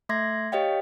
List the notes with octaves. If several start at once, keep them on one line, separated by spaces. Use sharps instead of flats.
A3 E5 C6 G#6 A#6
G4 C#5 D#5 F5 G5